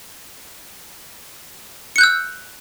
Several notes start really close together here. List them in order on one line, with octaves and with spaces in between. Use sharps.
C#7 F#6 G6 E6